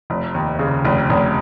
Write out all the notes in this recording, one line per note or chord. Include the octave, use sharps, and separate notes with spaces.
F1
D#2
C#3
F1
F1